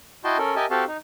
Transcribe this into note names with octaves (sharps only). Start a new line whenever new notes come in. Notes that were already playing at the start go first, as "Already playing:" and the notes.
E4 F#4 D#5 G5 A5 C6
C#4 A4 A#4
G4 A#4 D#5 E5 G#5 A5
C4 F#4 G4 A4 F5 A5
D#4